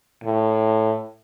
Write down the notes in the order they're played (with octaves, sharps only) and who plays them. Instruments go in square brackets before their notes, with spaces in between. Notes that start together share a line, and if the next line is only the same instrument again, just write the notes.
[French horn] A2